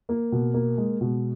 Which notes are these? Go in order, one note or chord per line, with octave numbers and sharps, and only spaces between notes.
A#3
B2
A#3
G#3
B2